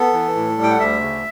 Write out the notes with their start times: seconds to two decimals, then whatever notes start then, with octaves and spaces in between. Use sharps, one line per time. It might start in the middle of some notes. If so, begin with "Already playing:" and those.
Already playing: B3 A4
0.13 E3
0.35 A2
0.57 G3
0.63 G5
0.70 F#5
0.79 D2 E5
1.01 C#3